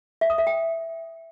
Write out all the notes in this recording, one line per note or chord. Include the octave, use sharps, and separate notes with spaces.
E5
D#6
E5
G5